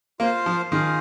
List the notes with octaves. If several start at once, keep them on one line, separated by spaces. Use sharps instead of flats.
A#3 F4 C5 F5
F3
D#3 F4 G#4 F5